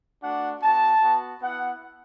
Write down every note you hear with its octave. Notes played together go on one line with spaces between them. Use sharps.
A3 D4 F#4 F#5
B3 F#4 A5
B3 F#4
B3 E4 F#5